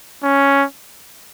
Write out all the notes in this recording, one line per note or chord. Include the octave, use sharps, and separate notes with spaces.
C#4